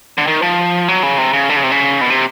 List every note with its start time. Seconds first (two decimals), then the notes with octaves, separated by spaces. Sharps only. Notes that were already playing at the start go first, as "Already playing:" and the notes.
0.18 D3
0.27 D#3
0.42 F3
0.88 F#3
1.03 C#3
1.18 C3
1.33 C#3
1.49 D3
1.56 C#3
1.63 C3
1.71 C#3
2.01 B2
2.10 C3